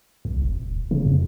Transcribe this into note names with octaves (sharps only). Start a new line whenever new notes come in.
C2
F1
D#1
C#3
F2